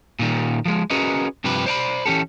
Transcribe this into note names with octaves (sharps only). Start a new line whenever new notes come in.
A#2 D#3 G3
F3 G#3
C#4 F#4 G#4 A#4 B4 D#5
G2 C3 F3 G4 B4
C5 D5 A#5 B5
E3 C#4 G4 A4